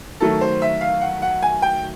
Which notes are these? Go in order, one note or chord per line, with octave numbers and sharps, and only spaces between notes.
D#3 F#3 A3 A4
C5
E5
F5
F#5
F#5
G#5
G5